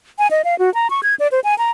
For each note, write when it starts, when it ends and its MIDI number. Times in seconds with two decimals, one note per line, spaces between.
0.19 0.27 80
0.31 0.42 75
0.45 0.58 77
0.59 0.73 66
0.74 0.90 82
0.90 1.01 85
1.03 1.15 92
1.20 1.28 74
1.32 1.40 72
1.44 1.57 80
1.58 1.71 82